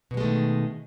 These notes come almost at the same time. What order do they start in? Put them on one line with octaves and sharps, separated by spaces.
B2 F#3 G#3 A3 D#3